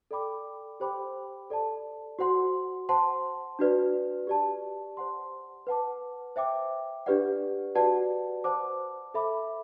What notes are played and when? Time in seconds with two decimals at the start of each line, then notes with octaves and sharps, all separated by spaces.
0.11 A4 D5 G5 B5 D6
0.80 G4 C5 G5 B5 D6
1.50 A4 D5 A5
2.19 F#4 C5 F#5 C6
2.89 C5 F#5 A5 C6
3.59 D4 F#4 B4 D5
4.27 G4 D5 A5
4.97 C5 F#5 C6
5.67 B4 F#5 A5 D6
6.36 C5 E5 G5 D6
7.06 D4 G4 B4 D5 F#5
7.75 F#4 B4 D5 F#5 A5
8.44 C5 F#5 A5 D6
9.14 A4 E5 B5 D6